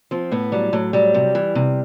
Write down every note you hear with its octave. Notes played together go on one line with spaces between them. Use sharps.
F3 C4
A2 B3
F#3 G3
A2 F#3
F#3 G3
C3
E3
C3